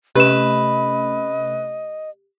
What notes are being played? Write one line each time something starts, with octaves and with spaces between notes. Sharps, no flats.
C3 A3 C#4 G4 B4 D#5 E7